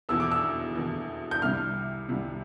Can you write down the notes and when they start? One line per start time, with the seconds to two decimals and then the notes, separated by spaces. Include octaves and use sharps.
0.09 E2 B2 A3 E6
0.20 D6
0.31 E6
0.75 E2 B2 A3
1.31 G6
1.42 C2 C3 G3 F6
2.09 C2 C3 G3